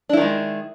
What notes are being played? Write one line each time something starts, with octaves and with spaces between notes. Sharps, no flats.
D#3 G#3 D4 E4